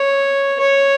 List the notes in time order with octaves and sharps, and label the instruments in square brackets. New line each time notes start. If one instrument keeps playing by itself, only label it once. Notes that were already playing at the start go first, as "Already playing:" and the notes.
Already playing: [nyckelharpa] C#5
C#5